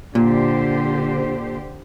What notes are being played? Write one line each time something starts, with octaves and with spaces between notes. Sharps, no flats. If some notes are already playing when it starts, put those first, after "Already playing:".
A#2 D3 G4 C5